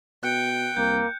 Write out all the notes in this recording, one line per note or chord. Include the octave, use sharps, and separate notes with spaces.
B2 G5 F#6 C#7
C2 A#3 G6